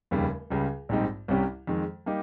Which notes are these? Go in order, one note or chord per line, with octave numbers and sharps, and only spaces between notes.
F1 D#2 C#3 G3
C#2 C#3 G3
A#1 G#2 G3 C4 D#4
C2 C3 G3 C#4 G4
F2 D#3 G#3
G3 A#3 D#4 G4